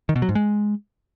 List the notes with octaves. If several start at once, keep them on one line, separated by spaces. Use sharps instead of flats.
D#3
B2
F#3
G#2
G#3